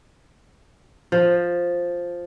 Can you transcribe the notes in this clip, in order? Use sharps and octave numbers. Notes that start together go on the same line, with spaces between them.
F3